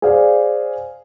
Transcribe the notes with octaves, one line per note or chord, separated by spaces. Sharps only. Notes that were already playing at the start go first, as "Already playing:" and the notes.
G#4 C5 D5 F5